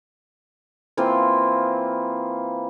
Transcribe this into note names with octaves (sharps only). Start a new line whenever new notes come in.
E3 A#3 C4 F4